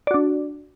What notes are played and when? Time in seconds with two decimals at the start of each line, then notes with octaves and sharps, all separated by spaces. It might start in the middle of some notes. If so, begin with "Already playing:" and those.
0.07 D5
0.11 F#4
0.14 D4